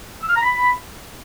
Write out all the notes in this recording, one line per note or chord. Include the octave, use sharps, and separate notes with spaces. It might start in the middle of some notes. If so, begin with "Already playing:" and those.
E6
F6
A#5
B5